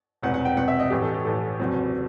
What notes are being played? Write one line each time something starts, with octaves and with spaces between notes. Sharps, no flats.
E1 E2 C3 F#5
F#5
G5
E1 E2 C3 F#5
E5
D#5
A1 A2 E3 A3 G4
A4
G4
A1 A2 E3 A3 A4
F#1 E2 C3 F#3 C4